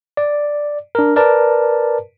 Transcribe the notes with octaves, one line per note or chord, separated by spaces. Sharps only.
D5
D4 A#4
A#4 B4 D5 A5